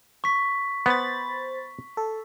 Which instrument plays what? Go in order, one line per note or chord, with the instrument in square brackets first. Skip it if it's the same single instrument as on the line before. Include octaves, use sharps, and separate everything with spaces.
[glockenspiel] C#6 B6
[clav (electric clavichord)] B3 [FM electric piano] C5 B5 A6
[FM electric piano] A4